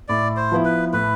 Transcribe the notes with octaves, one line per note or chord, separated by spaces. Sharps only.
A2 D5
C5
F3 B3 E4
B4
A2 B4